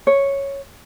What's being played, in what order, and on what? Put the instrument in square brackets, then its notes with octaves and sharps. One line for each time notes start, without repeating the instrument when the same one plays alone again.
[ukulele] C#5